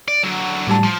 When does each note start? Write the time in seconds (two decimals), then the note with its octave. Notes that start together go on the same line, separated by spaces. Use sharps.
0.08 D5
0.23 D3 F#3
0.67 A2 G3 A5
0.84 F3